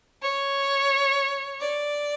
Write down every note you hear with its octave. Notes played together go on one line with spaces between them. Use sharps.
C#5
D5